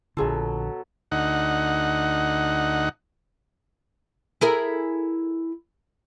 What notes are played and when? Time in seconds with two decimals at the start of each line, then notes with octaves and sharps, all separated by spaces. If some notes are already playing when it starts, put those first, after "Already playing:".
0.17 A#1 B2 D3 F#3 F4 G#4 A4
1.12 D2 D#4 F#5
4.41 E4 G#4 A#4